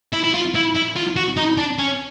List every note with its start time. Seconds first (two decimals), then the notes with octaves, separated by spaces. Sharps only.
0.13 E4
0.24 E4
0.34 F4
0.55 E4
0.75 E4
0.96 F4
1.16 F#4
1.37 D#4
1.57 D4
1.79 C#4